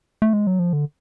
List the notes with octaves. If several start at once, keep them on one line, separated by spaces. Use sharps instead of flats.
A3
G#3
F#3
F3
D3